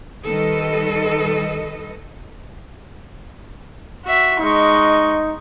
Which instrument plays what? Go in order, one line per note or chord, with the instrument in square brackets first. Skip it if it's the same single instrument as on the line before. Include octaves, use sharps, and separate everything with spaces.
[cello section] D#3 G3 A4 B4 D#5
[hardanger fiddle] F#4 E5
[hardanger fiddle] G#3 C#6 [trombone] D#4